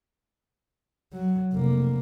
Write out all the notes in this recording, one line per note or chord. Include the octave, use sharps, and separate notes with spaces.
F#3
F1 A#3